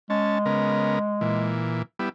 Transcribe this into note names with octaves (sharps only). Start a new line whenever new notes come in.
G#3 C#4 A5
C#3 B3 A#4
A#2 E3
G3 B3 E4